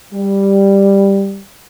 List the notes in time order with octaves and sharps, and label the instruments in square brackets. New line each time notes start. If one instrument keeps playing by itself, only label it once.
[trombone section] G3